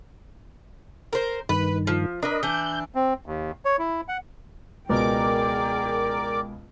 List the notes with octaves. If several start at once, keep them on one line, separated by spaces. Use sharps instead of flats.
A#4 C5
G2 D#3 B4
F3
D4 A#4 B4 D#5
E3 D4 G6
C4
D#2
C#5
E4
F#5
C#2 B2 G#4 A#4 D5 G5 D6